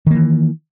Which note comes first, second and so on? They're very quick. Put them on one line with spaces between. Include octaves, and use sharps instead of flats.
D#3 A#3 E3